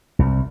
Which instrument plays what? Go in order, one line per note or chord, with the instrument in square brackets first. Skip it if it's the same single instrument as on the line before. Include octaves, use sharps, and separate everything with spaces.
[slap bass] C2